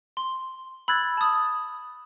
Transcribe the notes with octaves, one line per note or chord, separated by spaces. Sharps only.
C6
B5 E6 F#6 G#6 A6
A5 D#6